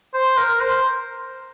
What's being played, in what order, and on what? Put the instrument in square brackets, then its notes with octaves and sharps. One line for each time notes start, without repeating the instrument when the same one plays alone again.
[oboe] C5
A#4
C5